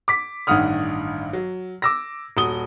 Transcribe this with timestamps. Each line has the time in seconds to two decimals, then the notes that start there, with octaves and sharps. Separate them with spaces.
0.08 D6 B6
0.47 A1 G2 D#3 F#5 D#6 F6
1.33 F#3
1.82 D6 E6 A#6
2.37 D#1 F#4 D#6 G7